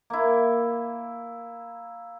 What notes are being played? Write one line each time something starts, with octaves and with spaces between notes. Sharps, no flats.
A#3 E4